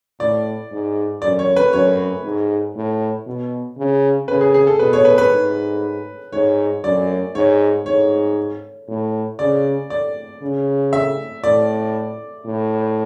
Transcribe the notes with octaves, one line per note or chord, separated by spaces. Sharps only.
A2 D5
G#2
F#2 D5
C#5
B4
F#2 C#5
G#2
A2
B2
C#3
C#3 B4
G#4
G#4
A4
B2 B4
C#5
B4
B4
G#2
G#2 C#5
F#2 D5
G#2 C#5
G#2 C#5
A2
C#3 D5
D5
C#3
E5
A2 D5
A2